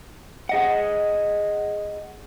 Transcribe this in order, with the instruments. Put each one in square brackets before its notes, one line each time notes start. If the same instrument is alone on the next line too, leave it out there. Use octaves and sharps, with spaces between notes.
[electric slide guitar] G#4 D#5 F#5